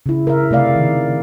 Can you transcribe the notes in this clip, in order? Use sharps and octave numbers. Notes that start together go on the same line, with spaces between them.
C#3 E4
A#4 E5
C3 A3 D5 F5
D#3